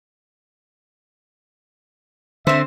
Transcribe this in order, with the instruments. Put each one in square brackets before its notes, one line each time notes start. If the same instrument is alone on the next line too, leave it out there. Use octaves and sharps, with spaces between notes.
[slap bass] D3 [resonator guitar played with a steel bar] C4 C5 [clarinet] E5